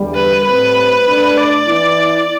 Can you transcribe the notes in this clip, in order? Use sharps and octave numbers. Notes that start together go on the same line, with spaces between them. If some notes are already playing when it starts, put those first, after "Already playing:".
Already playing: E2 D3 G3
B4
A2 G3 C4 B4
B2 A3 D4
D5
E3 B3 E4